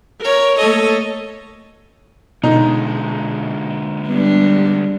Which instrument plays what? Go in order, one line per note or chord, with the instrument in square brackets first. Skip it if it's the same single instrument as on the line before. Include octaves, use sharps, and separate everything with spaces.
[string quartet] A#4 C#5
A3 A#3 A4 C#5 D#5
[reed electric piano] B2 [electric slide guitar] D3 G#3 [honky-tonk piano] D#4
[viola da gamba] G3 D4 [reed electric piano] B3